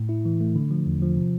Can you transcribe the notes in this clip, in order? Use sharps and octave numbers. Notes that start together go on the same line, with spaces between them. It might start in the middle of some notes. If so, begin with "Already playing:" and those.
Already playing: A2
E4
E3
A3
D3
F3
E2
F3
C3